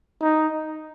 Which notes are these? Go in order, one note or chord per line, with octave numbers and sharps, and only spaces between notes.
D#4